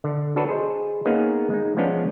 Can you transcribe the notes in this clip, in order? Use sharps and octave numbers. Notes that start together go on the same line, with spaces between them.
D3
D4 F#4 A4 B4 C#5
G#4 C5 D#5
A#3 B3 C#4 D#4 G#4
G#3 D#4
F3 G#3 B3 C#4 D4